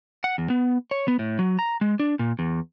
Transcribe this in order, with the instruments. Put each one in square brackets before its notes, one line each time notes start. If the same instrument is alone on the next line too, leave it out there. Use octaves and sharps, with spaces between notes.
[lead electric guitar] F#5
E2
B3
C#5
B3
A2
F#3
A#5
G#3
D4
A#2
E2